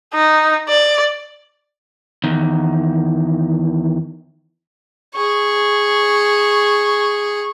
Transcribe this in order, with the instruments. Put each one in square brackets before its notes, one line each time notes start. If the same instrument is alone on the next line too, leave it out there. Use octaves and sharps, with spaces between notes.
[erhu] D#4
D5
[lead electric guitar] E2 D#3
[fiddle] G#4 C#6